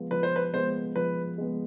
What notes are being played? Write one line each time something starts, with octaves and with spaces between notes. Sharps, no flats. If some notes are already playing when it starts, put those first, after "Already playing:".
Already playing: F3 G#3 B3
F3 B4
C5
B4
G#3 B3 C5
F3 B4
G#3 B3